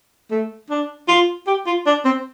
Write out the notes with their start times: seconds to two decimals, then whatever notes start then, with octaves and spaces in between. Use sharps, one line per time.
0.31 A3
0.70 D4
1.08 F4
1.47 G4
1.66 F4
1.86 D4
2.05 C4